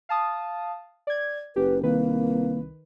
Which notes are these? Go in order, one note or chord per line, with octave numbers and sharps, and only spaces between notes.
F5 A5 D#6
D5 G#6
F#1 G4 B4
C2 D#3 A#3 B4